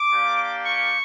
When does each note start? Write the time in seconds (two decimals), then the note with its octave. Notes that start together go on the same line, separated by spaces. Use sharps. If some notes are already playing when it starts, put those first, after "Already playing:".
Already playing: D6
0.12 A#3 D4 G4
0.64 C#6